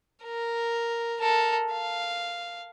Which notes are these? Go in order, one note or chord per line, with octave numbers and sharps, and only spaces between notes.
A#4
A4 A#4
F5